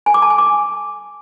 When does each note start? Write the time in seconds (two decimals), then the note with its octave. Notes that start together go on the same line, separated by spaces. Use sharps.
0.06 G#5
0.14 D6
0.22 A5
0.30 G#5
0.38 D6